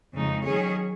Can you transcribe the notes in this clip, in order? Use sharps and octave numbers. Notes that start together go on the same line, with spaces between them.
F2 C#3 G#3 D#4
D#3 F#3 C#4 G#4 C#5